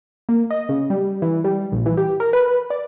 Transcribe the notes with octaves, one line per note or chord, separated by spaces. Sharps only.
A#3
D#5
C#3
G3
E3
G3
A#1
E3
G4
A#4
B4
D5